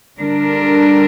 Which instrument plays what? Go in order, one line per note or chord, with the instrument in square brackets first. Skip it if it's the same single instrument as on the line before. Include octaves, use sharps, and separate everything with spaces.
[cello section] D3 G3 D4 A#4